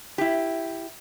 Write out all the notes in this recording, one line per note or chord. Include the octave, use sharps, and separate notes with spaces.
E4 G4